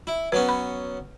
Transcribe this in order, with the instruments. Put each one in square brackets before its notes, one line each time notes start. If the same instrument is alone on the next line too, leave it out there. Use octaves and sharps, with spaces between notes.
[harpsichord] E4
[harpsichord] F#3 B3 C#4 [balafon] B4
[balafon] B5